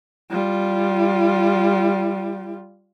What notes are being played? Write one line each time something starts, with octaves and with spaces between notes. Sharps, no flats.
G3 F4